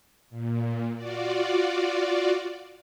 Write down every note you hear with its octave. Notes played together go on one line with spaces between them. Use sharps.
A#2
F4 F#4 D5